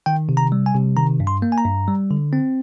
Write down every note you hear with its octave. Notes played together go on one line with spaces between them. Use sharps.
D#3 G5
C3
A#5
G3
G#5
C3
D#3 A#5
G2
C6
A#3
G#5
A#5
G2
G3
D3
C4